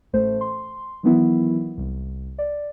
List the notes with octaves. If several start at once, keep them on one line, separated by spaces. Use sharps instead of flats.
A1 A3 C5
C6
D#3 E3 F#3 B3 E4
C2
D5